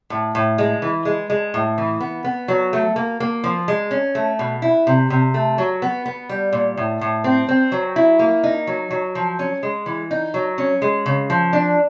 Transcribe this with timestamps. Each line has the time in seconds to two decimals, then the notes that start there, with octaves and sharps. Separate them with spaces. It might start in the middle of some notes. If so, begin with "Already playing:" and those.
0.10 A2
0.35 A2
0.58 G#3
0.82 E3
1.05 G#3
1.30 G#3
1.54 A2
1.78 E3
2.00 B3
2.24 B3
2.48 F#3
2.73 A3
2.96 A#3
3.20 A#3
3.44 F3
3.68 G#3
3.91 C#4
4.15 A3
4.39 B2
4.62 E4
4.87 C3
5.10 C3
5.34 A3
5.58 F#3
5.82 B3
6.06 B3
6.29 G3
6.53 A#2
6.77 A2
7.01 A2
7.24 C4
7.48 C4
7.72 F#3
7.96 E4
8.19 A#3
8.44 D#4
8.67 F#3
8.91 F#3
9.15 F3
9.39 C#4
9.63 G#3
9.86 E3
10.11 D#4
10.34 F#3
10.58 C#4
10.82 G#3
11.06 C#3
11.30 F3
11.53 D4